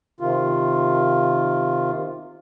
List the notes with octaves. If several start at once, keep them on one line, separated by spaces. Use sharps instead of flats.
C3 D#3 F4